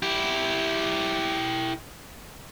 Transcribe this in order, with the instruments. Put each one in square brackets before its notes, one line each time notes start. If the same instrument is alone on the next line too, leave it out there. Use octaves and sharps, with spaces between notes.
[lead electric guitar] E4 G4